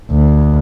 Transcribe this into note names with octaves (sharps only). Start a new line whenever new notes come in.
D2